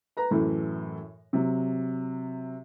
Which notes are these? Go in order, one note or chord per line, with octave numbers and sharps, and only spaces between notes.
B4 A#5
F#2 A2 E3
C3 F#3